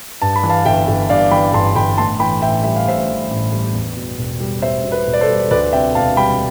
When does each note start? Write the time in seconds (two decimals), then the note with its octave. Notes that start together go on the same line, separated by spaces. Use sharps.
0.22 G2 A5
0.36 B5
0.43 E3
0.50 F5 A5
0.66 G1 E5 G5
0.88 G1
1.09 G2 D5 F5
1.31 E3 G5 B5
1.54 G1 A5 C6
1.76 G1 G5 B5
1.97 A2 A5 C6
2.20 E3 G5 B5
2.42 A1 E5 G5
2.64 G3 E5
2.76 F5
2.86 A2 C5 E5
3.08 E3
3.31 A1
3.52 G3
3.75 E2
3.97 B2
4.18 E1
4.40 G3
4.62 E2 C5 E5
4.85 B2
4.92 B4
5.07 E1
5.13 D5
5.21 A4 C5
5.29 G3
5.51 D2 B4 D5
5.73 C3 E5 G5
5.95 E1 F5 A5
6.16 G3 G5 B5